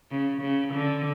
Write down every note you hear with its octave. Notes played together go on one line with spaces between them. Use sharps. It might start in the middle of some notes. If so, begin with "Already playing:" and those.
C#3
C#3
D3